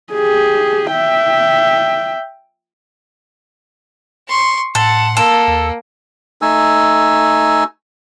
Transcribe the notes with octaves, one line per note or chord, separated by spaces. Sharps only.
G4 G#4
E5 G5
C6 C#6
A2 A4 F#5 C6
A#3 A4
D#2
A3 D#4 G#5 E6